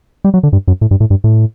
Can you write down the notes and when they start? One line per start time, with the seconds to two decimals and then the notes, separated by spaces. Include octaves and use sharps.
0.24 G3
0.34 F#3
0.43 D3
0.53 G2
0.67 F#2
0.81 A2
0.91 G2
1.00 A2
1.10 G2
1.24 A2